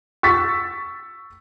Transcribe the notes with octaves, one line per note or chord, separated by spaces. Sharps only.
C#6 E6 A6 B6